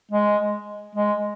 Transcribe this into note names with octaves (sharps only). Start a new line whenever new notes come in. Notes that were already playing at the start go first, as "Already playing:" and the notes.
G#3
G#3